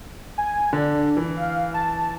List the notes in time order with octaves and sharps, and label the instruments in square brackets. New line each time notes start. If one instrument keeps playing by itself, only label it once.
[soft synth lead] G#5
[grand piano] D3 [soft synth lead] D4
[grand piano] E3
[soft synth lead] F5
A5